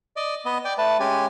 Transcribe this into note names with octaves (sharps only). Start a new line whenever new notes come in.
D5 D#5
B3 D#5
D5 G5
A3 B4 A5
G#3 C#4 G4 G#5